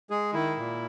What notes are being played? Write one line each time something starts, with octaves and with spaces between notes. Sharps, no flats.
G#3 G#4
D#3 E4
A#2